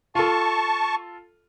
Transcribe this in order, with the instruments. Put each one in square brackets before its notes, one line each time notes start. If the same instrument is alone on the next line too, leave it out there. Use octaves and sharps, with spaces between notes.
[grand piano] F4 A4 [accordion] A5 C#6